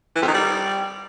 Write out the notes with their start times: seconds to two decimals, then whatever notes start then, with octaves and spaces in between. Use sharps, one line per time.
0.15 E3
0.21 F2
0.28 D#3
0.34 G3